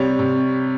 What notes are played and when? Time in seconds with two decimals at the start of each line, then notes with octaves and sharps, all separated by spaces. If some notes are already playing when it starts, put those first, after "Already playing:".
Already playing: C3 G3 C#5
0.19 C3